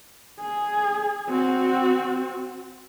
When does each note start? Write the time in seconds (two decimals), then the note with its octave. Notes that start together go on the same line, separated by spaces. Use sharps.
0.40 G#4
1.29 C4 F#4